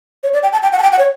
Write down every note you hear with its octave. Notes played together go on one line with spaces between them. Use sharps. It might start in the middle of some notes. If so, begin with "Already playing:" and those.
C#5
D5
G5
A5
G5
F#5
A5
G5
F#5
C#5